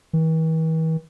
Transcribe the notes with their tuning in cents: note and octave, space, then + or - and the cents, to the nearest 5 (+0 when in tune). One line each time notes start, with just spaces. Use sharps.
E3 -45